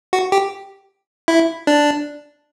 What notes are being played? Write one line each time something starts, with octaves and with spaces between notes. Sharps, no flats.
F#4
G4
E4
D4